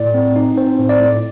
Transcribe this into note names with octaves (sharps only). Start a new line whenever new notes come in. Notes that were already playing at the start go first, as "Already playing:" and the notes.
Already playing: A2 D5
C4
D#4
C4 C5
A2
D5
A2